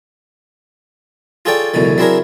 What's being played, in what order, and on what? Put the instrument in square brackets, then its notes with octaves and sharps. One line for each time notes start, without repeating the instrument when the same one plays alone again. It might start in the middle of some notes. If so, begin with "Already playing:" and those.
[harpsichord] F4 G#4 A4 C#5 D5 G5
C#2 F#2 B2 D3 E3
F#3 C4 D4 E4 G#4 A#4